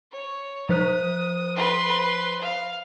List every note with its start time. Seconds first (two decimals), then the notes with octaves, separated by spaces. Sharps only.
0.12 C#5
0.69 F3 C5 D#6 F#6
1.56 B4 C6
2.41 F5